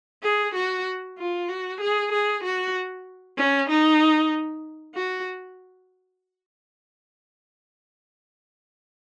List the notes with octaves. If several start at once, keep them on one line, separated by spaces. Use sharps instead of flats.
G#4
F#4
F4
F#4
G#4
G#4
F#4
C#4
D#4
F#4